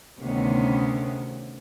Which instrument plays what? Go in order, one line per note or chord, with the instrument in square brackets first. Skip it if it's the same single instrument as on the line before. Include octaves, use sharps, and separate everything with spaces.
[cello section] D2 C3 D#3 B3 C#4